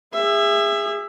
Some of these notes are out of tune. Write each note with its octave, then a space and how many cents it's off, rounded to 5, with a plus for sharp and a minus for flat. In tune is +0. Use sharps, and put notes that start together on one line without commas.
G#4 -25 E5 +15